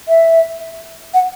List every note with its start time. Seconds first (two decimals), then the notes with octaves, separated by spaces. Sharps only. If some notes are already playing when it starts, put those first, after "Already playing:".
0.08 E5
1.14 F#5